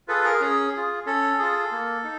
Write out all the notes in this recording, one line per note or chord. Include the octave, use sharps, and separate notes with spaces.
F4 G#4 A4 B4
G#4 A#4
C#4 G#4
F4 G#4
C#4 A4
F4 G#4
A#3
D#4